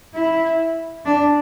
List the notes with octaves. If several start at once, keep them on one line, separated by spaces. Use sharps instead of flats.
E4
D4